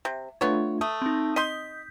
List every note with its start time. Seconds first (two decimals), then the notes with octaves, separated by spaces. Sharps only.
0.05 C3
0.41 A3 B3 D4 F4 C#5
0.81 A3 D#6
1.02 C4 D#4
1.36 D#5 C6 G6 B6